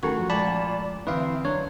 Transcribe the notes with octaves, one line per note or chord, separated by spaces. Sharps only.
D#3 A3 C#4 F#4 A4 C#6
F3
A#2 G#3 D5 A5 B5
D3 E3 C4 E4 B4 E5 F5
F#3 D4 C#5